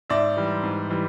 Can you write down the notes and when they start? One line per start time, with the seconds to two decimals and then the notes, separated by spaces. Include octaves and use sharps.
0.10 G#2 D5 E5
0.37 E3 G3
0.63 G#2
0.90 E3 G3